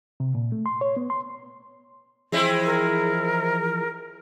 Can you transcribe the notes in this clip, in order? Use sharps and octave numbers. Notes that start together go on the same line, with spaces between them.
C3
A#2
A3
C6
C#5
B3
C6
E3 F3 G#3 C4 E4 G#4
A#4